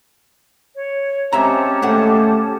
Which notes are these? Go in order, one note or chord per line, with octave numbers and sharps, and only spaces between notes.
C#5
G#3 C4 C#4 G4 E5 A5 A#5
D#2 G#2 A3 F#5